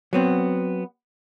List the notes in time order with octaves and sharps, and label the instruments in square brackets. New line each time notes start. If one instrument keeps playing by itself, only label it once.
[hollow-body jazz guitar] F#3 B3 C4